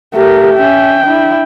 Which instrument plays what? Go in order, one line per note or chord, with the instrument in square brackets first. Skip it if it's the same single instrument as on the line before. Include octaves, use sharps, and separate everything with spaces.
[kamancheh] A3 [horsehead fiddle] G4 A#4
[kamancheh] C#4 E5 [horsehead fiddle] G5
[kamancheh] D4 E4